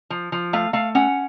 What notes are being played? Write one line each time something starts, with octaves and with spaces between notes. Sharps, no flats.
F3
F3
A3 F5
A3 F5
C#4 F#5